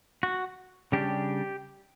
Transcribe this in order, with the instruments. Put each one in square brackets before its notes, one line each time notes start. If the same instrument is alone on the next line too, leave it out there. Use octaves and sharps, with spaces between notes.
[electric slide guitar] F#4
C#3 G3 D4 G4